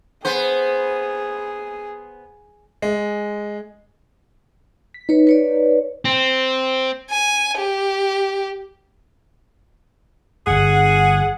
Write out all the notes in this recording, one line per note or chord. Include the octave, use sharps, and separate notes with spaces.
B3 G#4 C5
G#3
B6
D#4 B4 C#5
B4 C#5 D5
C4
G#5
G4
G1 G2 G#4 F#5